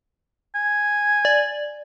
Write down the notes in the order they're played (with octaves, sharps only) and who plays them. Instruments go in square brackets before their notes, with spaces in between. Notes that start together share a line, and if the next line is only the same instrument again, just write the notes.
[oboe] G#5
[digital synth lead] D5